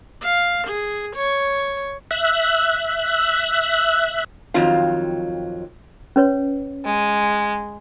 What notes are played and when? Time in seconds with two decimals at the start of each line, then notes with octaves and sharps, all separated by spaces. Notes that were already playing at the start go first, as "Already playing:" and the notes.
0.23 F5
0.67 G#4
1.16 C#5
2.11 E5 F#6
4.54 F2 D#3 F#3 C4 F4 F5
6.16 C#4 B4 C#5
6.85 G#3